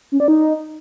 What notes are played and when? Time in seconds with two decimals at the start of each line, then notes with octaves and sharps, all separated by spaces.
0.12 C#4
0.20 D5
0.28 D#4